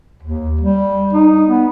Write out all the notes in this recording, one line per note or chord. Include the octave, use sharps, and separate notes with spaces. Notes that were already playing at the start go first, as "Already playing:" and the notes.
D#2
G3
D#4
B3